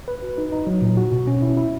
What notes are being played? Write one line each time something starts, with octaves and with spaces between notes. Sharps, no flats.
B4
F#4
D#4
D#4
F#3
A#2
F#4
B2
C#4
E4
E4